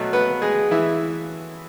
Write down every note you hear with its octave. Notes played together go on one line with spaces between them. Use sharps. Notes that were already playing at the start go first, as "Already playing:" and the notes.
Already playing: B2 F#3 A3
B3 B4
G#3 G#4
E3 E4